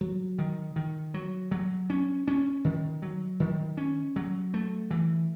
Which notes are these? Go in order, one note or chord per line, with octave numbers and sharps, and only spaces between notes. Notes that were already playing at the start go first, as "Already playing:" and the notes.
F#3
D#3
D#3
F#3
F#3
C#4
C#4
D#3
F#3
D#3
C#4
F#3
A3
E3